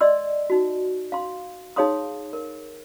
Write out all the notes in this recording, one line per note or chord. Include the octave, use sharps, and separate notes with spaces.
D5 D#5 C6 E6
D#4 F#4
F5 C6
D#4 G#4 C#5 F5 C6 D#6
A#4